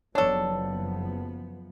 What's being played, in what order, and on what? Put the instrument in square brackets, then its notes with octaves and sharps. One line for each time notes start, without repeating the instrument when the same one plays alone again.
[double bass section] F#1 F3 B3 [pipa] D4 A4 [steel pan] C#5